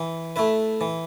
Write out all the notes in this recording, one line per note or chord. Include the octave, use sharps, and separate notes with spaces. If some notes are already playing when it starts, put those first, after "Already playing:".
Already playing: E3
A3 E4 B4
E3